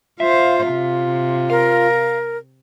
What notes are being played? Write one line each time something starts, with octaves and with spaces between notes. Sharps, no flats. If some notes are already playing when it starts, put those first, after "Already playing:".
F4 C5 E5 F5
C3
A#4 F5